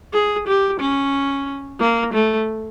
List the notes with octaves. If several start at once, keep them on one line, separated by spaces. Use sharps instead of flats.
G#4
G4
C#4
A#3
A3